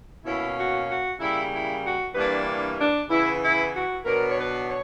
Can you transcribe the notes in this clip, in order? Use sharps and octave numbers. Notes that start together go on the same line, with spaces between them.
B2 A#3 C#4 E4
F#4
F#4
C#3 G3 A#3 E4
E4
F#4
G2 E3 G3 A#3 D4 B4
D4
C#3 E3 B3 E4
E4
F#4
B2 F#3 B3 D4 A#4
C#5
B4
C#5